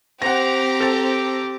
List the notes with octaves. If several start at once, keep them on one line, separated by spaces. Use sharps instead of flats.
C4 G4 F#5 A#5 A#6
A4 A6